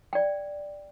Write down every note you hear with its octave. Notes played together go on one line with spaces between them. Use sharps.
D5 G5